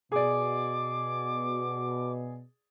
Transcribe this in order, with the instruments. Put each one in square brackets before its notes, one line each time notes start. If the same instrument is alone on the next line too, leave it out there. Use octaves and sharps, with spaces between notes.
[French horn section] B2 [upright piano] G#4 D5 [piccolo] D6